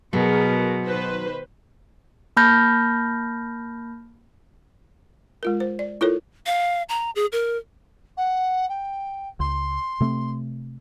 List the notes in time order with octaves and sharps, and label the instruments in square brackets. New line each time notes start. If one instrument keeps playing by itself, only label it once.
[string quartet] B2 [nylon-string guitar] F#3 [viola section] G#4 A#4
[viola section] D#3 B4 C5
[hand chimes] A#3 A5 B5 F6 G6 A#6
[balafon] G#3 F4 A#4
C5
D5
E4 F4 A4 A#4 C#5
[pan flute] F5
A#5
G#4
A#4
[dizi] F#5
G5
[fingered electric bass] C#2 [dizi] C6
[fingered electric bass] C3 A3 C4